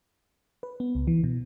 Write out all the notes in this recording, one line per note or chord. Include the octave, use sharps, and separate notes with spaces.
B4
B3
C#2
E3
B2